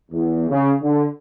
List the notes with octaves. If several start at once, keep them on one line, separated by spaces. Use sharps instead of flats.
E2
C#3
D3